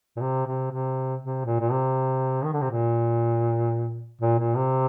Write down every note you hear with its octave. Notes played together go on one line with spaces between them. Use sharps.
A#2
C3
C3
C3
C3
A#2
A#2
C3
D#3
D3
C3
A#2
A#2
A#2
C3